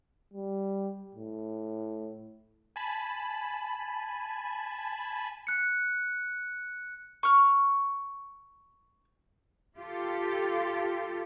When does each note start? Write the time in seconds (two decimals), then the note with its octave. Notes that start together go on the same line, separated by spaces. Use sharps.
0.33 G3
1.15 A2
2.76 G#5 A5 B5
5.47 F#6 C#7
7.23 C#6 F6
9.77 F4 G4 A4